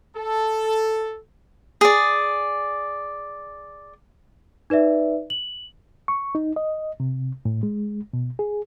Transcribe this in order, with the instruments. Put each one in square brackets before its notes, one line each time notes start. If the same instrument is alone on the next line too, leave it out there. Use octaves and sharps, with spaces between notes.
[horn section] A4
[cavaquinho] G#4 D5
[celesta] D#4 B4 D5 E5
F#7
[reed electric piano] C#6
D#4
D#5
C3
A2
G#3
B2
G#4